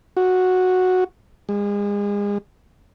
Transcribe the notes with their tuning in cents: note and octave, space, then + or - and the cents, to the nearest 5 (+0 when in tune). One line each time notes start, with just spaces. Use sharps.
F#4 -5
G#3 -35